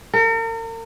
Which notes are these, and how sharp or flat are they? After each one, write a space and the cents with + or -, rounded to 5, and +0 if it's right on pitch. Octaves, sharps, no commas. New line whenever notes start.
A#4 -40